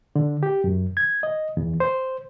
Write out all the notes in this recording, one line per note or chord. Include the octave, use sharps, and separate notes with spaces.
D3
G4
F#2
G#6
D#5
E2
C5